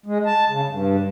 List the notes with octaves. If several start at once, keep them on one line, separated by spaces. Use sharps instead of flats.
G#3
A5
C#3
G2